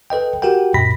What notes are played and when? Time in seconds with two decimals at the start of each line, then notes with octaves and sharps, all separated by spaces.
0.10 A4 B4 D#5 G5
0.42 F#4 G4 A#4 F#5 G5
0.74 F#2 A#2 B5 A#6 B6